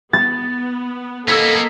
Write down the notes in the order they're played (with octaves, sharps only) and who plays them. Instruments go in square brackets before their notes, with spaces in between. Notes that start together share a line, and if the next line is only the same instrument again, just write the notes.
[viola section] B3 [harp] A6
[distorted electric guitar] A#3 B3 [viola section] A4 D#5 [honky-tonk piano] E6 G#6 B6